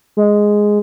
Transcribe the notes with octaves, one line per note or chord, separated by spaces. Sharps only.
G#3